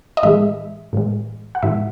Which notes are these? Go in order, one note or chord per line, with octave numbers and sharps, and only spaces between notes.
D#5
A2 E3 G#3 E5
A2 E3 G#3
F#5
A2 E3 G#3 E5